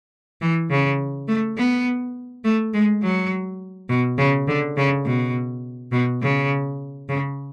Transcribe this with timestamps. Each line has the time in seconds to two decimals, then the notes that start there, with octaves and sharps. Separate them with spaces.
0.41 E3
0.71 C#3
1.28 A3
1.57 B3
2.44 A3
2.74 G#3
3.03 F#3
3.89 B2
4.18 C#3
4.48 D3
4.77 C#3
5.06 B2
5.92 B2
6.22 C#3
7.09 C#3